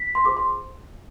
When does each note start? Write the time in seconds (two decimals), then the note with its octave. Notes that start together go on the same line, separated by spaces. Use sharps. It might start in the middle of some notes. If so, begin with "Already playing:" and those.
Already playing: B6
0.15 C6
0.24 F4 G#4 C5 D6
0.37 C6